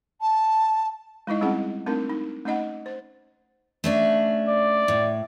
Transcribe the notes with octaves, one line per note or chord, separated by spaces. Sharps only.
A5
G#3 D#4 E4 D#5
G3 C4 C#4 E4 G#4 F#5
A3 C4 D4 D#4 A#4
D#4
A3 C#4 D#4 D#5 F#5
C5
A3 C#4 D4
D5
A2